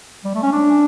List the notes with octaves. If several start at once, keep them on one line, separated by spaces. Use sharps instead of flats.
G3
A3
C#4
D4